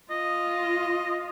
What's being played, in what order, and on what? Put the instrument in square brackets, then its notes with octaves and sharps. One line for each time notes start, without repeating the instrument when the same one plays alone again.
[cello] F4 [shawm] D#5